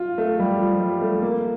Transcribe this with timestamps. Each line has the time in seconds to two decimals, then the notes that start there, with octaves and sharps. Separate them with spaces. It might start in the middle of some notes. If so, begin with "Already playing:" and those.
Already playing: F4
0.18 A3
0.39 G3
0.60 F3
0.80 G3
1.01 A3
1.22 A#3